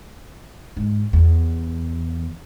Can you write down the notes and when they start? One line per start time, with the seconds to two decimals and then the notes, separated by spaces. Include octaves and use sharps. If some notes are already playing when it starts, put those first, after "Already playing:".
0.76 G#2
1.13 E2